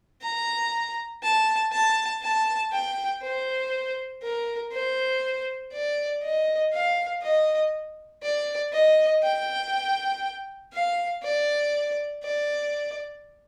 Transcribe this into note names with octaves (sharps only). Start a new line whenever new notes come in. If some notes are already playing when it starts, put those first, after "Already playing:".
A#5
A5
A5
A5
G5
C5
A#4
C5
D5
D#5
F5
D#5
D5
D#5
G5
F5
D5
D5